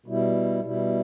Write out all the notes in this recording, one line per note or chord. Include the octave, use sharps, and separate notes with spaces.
B2 G3 E4
B2 G3 E4